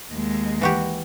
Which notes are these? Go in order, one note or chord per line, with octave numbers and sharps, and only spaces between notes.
D#2 G#3
E3 F#4 G4